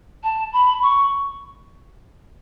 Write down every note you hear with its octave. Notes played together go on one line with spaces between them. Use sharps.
A5
B5
C#6